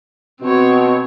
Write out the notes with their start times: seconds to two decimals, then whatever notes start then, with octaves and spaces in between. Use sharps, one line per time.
0.41 B2 C4 C#5